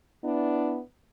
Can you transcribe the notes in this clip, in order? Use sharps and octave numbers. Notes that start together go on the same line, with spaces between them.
B3 D4 E4